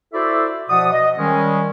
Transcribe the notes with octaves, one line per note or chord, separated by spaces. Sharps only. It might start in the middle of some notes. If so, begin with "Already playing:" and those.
E4 F#4 A4 C5 D5 E5
B2 F3 D5 F#5 D#6
D#5
D#3 G3 G#3 C#4